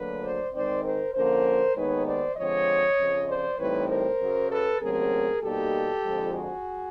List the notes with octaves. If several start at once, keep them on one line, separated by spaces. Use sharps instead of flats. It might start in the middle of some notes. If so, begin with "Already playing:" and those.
Already playing: D2 D3 F#3 A#3 B4
C5 D5
G#2 D#3 G#3 C4 D#4 C5 D5
A#4 C5
D3 F3 A#3 C#4 A#4 C5
D#2 D#3 G#3 B3 D#4 B4 C#5
C5 D5
D3 F3 G#3 C4 C#5 D#5
F2 C#3 F3
C5 D5
A2 E3 G3 C4 D#4 B4 C#5
A#4 C5
F#2 C#3 F#3
A4 B4
D#2 C#3 F#3 A3 C4 G#4 A#4
B2 G3 A#3 D#4 G4 A4
F2 D3 F3 G#3
F#4 G#4